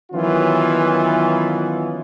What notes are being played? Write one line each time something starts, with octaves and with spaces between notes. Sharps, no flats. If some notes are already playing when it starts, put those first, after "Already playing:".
D#3 E3 F#3 B3 C#4 F4